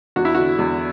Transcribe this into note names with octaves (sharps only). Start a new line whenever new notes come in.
E2 F#4
E4
D3 F#4
E2